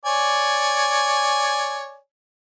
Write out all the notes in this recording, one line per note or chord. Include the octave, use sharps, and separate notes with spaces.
C#5 D5 G#5